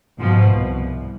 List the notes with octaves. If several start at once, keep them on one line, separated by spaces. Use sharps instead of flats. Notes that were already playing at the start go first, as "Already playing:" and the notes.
G#2 B2 F3
C2